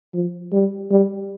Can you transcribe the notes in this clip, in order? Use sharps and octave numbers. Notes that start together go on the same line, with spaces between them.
F3
G3
G3